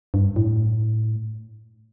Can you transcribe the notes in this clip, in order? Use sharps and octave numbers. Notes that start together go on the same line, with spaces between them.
G2
A2